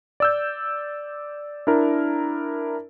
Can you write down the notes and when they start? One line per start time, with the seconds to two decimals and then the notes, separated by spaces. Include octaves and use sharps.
0.20 D5 E6 G6
1.67 D4 E4 A#4